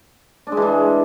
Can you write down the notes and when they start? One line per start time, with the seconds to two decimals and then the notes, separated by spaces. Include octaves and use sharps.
0.47 D4
0.52 G#3
0.57 E3
0.62 G#3